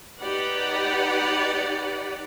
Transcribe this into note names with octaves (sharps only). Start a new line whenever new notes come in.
D#4 G4 B4 D5 F#5